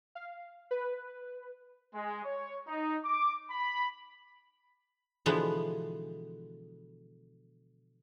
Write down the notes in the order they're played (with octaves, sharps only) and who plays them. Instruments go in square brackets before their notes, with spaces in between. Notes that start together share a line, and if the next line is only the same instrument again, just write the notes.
[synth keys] F5
B4
[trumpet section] G#3
C#5
D#4
D6
B5
[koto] B2 D3 E3 F3 G#3 B3